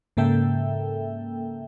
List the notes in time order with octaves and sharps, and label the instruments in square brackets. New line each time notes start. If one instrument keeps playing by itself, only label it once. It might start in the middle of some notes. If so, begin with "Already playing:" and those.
[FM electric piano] G#2 C#3 A#3 A4 E5 G5